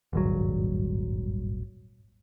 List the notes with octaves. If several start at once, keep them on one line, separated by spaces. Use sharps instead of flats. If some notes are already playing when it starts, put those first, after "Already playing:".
D#1 G#1 G2 F#3